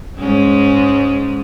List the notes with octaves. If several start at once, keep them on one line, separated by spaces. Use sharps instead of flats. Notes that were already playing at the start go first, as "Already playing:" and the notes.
G#2 G#3 C#4